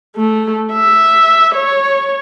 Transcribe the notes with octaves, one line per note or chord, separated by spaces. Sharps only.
A3
E5
C#5